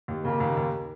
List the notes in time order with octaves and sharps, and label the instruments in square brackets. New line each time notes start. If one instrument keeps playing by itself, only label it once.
[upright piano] D#2
[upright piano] C#3 [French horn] A#3
[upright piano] D#2
D#2